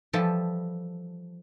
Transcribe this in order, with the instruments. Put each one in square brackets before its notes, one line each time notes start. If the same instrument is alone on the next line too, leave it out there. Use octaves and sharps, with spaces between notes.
[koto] E3 F3 G3 A4